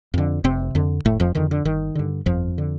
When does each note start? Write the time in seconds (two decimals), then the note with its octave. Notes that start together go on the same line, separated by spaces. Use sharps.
0.14 F2 D3
0.44 F1 C3 C4
0.75 F2 D3
1.05 F1 A2 A3
1.20 F2 F3
1.35 F2 D3 D#3
1.51 D3
1.65 G1 D#3
1.95 G2 D3
2.26 G1 F2 F3
2.58 D3